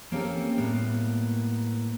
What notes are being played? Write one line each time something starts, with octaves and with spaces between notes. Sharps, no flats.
A#3 C4 C#4 G4 A4
A2 G3 A#3 B3